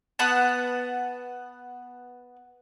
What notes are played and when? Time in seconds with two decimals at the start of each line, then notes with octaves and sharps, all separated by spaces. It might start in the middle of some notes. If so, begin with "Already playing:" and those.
0.19 B3 F#5 A5